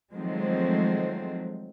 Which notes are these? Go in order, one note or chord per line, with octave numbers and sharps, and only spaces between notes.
D#3 F3 F#3 G#3 A3 C4